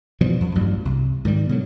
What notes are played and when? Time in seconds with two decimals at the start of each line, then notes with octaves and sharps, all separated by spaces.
0.21 B2 E3 F3 G3
0.41 F2
0.55 A1 G2 F#3 G3
0.85 C2
1.25 G#2 D#3 G3
1.49 B2 D3 F#3